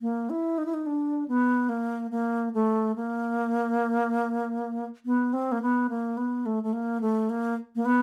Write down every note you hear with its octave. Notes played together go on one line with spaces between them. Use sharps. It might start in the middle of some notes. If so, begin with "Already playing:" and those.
A#3
E4
D#4
E4
D#4
D4
B3
A#3
A#3
A3
A#3
B3
C4
A#3
B3
A#3
B3
A3
A3
A#3
A3
A#3
A#3
B3